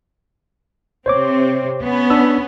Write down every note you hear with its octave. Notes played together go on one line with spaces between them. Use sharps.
C3 C4 C5 C#5 D6
B3 C#4
D4 E6